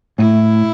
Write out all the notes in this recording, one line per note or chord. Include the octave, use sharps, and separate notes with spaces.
A2 E4